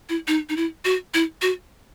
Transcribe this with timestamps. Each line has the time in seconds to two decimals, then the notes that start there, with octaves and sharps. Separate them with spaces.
0.09 E4
0.28 D#4
0.49 D#4
0.57 E4
0.85 F#4
1.14 E4
1.42 F#4